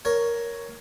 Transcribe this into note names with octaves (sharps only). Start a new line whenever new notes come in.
A#4 C#5